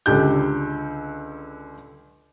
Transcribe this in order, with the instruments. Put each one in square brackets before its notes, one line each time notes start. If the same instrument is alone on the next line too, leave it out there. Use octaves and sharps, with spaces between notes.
[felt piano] C#2 D3 G4 G6